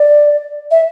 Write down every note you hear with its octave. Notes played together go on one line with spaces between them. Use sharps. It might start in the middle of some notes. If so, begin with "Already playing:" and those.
Already playing: D5
E5